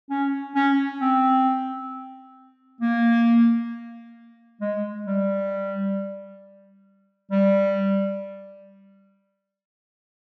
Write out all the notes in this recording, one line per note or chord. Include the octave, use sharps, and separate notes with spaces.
C#4
C#4
C4
A#3
G#3
G3
G3